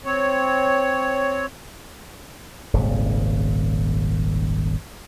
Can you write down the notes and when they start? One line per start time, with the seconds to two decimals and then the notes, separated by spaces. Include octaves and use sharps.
0.05 C4 C#5
2.73 D#1 G#1 C#3